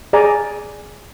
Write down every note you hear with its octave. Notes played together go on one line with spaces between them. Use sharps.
G#4 D5 G#5 A#5